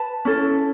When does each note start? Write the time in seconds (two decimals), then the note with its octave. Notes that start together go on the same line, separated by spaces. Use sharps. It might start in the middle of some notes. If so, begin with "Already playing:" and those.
Already playing: B4 A5
0.25 C#4 E4 A4